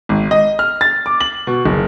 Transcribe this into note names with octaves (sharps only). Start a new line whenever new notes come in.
G#1
D#5
F6
A6
D6
F#7
B2
F#1